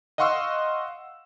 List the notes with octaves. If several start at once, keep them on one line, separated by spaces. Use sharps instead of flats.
D#5 F5 F#5 C6 C#6 E6